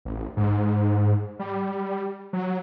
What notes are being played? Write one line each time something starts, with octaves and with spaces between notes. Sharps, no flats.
A1
G#2
G3
F#3